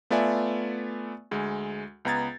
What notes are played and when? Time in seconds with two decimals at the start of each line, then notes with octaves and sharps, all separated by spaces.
0.10 A3 B3 F4 D5 E5 G#5
1.31 D2 G#3
2.05 C#2 B3 A#5 G#6 A6